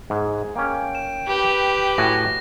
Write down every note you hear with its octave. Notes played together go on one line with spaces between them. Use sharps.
G#2 G#4
A#3 C#4 G5
E7
G4 B4
A2 F#4 G#5 A#6